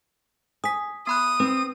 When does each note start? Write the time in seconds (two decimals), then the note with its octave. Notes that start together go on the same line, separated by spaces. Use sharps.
0.64 G#5 D#6 B6
1.07 B3 B5 D#6 F#6
1.40 C4 B4